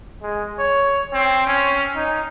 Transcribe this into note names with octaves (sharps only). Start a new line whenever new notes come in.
G#3
C#5
C4
C#4
D#4